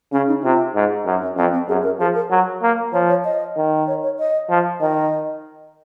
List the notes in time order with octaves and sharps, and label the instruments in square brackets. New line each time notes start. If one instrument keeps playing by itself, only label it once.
[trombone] C#3 [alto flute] C#4
[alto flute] D#4
[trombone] C3 [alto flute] F4
[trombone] G#2
F#2
[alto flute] C#4
[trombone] F2 [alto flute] C4
[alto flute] C4
[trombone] F#2 [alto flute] G#4
[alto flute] A#4
[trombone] F3 [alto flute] G#4
[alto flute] A#4
[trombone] F#3
A#3
[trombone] F3 [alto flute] C#5
[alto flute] C#5
D#5
[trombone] D#3
[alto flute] C#5
C#5
D#5
[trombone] F3
[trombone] D#3 [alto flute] D#5